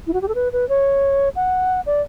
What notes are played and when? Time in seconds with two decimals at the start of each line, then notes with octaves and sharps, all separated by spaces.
0.07 E4
0.14 F#4
0.22 G4
0.28 A4
0.35 B4
0.53 B4
0.69 C#5
1.36 F#5
1.86 D5